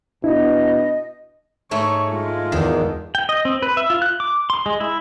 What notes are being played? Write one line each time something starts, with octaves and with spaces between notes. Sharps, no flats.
B2 D4 E4 D#5
G#2 A3 C#5
G#3 F4
E2 D#3
G5
D#5
C4
B4
E5
F4
F#6
D6
C6
G#3
E4